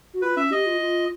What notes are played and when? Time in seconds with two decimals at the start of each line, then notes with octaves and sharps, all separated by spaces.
0.14 F#4
0.22 F4 B4
0.37 C#4 E5
0.51 G4 D#5
0.66 F4
0.80 F4